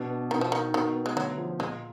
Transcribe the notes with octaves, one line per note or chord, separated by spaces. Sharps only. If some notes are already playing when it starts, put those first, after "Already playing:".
Already playing: B2 D4
B3
B2 D#3
F3
D#3 D#4
B2 D#3
B3
G#3
D2 F#3
F3
A#2 G#3